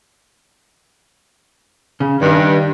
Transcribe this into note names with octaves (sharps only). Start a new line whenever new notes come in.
C#3
G2 D#3